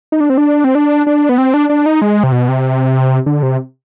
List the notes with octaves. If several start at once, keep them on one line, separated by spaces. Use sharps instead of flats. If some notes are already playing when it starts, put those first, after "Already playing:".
D#4
D4
C4
D4
C4
D4
D4
B3
C4
D4
D4
D#4
G#3
C3
B2
C3
D3
C3